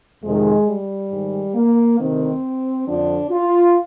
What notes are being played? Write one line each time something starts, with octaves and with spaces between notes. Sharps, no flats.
F2 C3 D#3 G#3
G3
G#2 D#3
A#3
D2 C3 D#3 C4
F2 D3 F3 D4
F4